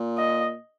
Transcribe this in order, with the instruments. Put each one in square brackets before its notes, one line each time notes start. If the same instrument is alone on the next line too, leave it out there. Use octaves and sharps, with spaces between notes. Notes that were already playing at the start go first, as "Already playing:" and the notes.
Already playing: [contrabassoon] A#2
[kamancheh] D#5